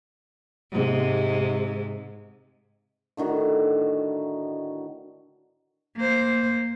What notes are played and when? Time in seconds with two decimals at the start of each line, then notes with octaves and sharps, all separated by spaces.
0.72 G#2 C3
3.17 A2 D3 D#3 F#4
5.96 A#3 C5